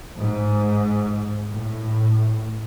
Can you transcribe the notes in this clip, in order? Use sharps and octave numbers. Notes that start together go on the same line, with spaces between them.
G#2
A2